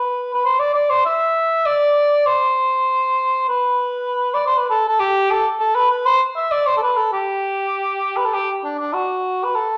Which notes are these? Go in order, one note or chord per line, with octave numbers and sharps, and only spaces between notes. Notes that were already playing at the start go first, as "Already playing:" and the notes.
Already playing: B4
B4
C5
D5
D5
C5
E5
D5
C5
B4
D5
C5
B4
A4
A4
G4
A4
A4
B4
B4
C5
E5
D5
C5
A4
B4
A4
G4
B4
A4
G4
D4
D4
F#4
B4
A4